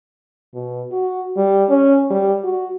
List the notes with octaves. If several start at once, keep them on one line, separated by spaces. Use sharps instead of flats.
B2
F#4
G3
C#4
G3
F#4